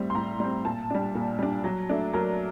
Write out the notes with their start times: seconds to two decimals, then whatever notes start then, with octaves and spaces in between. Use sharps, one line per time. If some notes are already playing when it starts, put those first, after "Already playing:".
Already playing: A2 G3 C4
0.10 C6
0.15 A2 A#5
0.40 G3 C4
0.65 A#2 A5
0.90 G3 D4
1.15 A#2
1.39 G3 D4
1.64 F#3
1.89 A3 D4
2.13 F#3 A#4